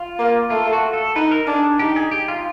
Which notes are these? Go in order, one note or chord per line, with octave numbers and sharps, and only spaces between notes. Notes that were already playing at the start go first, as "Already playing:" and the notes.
Already playing: F4
A#3
A3 F4
F#4
A4
D#4 B4
A#4
D4 G#4
D#4 G4
G#4
G4
F4